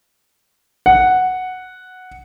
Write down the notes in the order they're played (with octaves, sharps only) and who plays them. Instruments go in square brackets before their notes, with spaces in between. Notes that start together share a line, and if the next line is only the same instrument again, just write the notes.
[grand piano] F#5